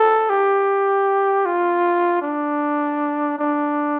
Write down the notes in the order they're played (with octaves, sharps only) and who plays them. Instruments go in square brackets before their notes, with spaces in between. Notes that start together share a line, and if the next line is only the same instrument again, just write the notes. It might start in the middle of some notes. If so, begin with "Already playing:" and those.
Already playing: [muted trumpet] A4
G4
F4
D4
D4